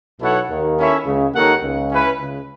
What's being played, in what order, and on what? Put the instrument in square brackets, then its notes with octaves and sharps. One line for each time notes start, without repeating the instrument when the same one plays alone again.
[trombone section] B1 B2 [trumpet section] E4 A4 C#5 F#5
[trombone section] D#2 D#3
[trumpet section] C#4 E4 A4 C#5 E5
[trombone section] C#2 C#3
[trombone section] D#2 D#3 [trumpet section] D#4 A4 C#5 F#5
[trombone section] C#2 C#3
[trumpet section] C#4 E4 B4
[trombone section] C#2 C#3